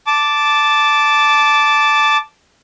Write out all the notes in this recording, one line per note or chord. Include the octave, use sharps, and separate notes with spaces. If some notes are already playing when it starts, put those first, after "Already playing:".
A5 D6